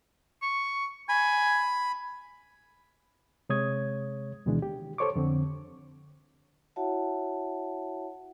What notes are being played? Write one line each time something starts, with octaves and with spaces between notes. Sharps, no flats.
C#6
G#5 B5
C3 G#3 C#5 D#6 G#6
D2 B2 D#3 E3 G#3 D4
G4
A4 C5 C#5 C#6 D6
F2 D3 C4
E4 F#4 C#5 E5 F#5 A5